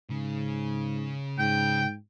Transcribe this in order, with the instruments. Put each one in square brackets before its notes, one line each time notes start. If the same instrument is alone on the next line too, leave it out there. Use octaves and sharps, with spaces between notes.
[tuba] G#2 [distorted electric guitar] C#3
[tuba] G#2 [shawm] G5